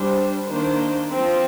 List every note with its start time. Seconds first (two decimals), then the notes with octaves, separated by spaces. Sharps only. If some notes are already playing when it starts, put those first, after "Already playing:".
Already playing: G3 D4 C5
0.47 D#3 A#3 D4 C5
1.12 F3 C4